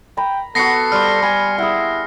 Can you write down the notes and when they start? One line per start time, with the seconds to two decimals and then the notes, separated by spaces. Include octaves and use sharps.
0.17 G5 A#5 B5
0.55 B3 F#4 A4 A#6 C7 C#7
0.92 G3 C5 F6
1.23 F5 G5 G#5 B5
1.58 E4 G#4 F#5